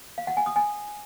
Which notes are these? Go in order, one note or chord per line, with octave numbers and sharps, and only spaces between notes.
F5
F#5
G#5
D#6
G#5